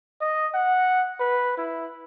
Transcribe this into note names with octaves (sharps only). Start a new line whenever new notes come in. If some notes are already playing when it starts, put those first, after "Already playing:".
D#5
F#5
B4
E4